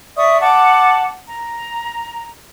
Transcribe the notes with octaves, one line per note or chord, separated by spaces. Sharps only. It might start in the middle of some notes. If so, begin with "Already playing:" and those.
D5 E5 C#6 D#6
F#5 A5 D6
A#5